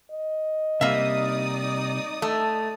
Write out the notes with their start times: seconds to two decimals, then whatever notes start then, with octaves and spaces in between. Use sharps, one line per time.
0.11 D#5
0.81 C3 G3 A#3 D#4 D5 E5 D#6
2.22 A3